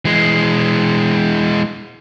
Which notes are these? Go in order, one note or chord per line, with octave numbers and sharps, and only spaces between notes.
E3 G#3